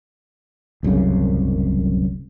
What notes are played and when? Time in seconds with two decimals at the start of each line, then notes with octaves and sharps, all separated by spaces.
0.83 D1 C2 F#2 C#3